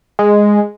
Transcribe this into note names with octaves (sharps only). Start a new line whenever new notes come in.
G#3